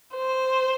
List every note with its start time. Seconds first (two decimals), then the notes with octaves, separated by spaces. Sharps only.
0.14 C5